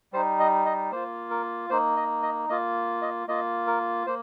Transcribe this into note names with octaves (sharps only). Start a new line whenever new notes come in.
G3 D#4 C5
D#5
D#5
A#3 F4 C5
A#4
A#3 D#4 C5
D#5
D#5
A#3 F4 D#5
D#5
A#3 F4 D#5
A#4
A#3 C5